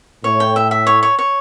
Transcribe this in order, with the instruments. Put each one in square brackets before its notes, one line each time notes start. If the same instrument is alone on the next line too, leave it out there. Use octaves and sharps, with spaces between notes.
[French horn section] A2 [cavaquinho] C#5
[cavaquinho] G5
E5
E5
C#5
C#5
C#5